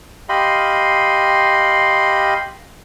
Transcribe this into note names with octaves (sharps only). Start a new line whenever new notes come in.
G4 D#5 F5 B5 C6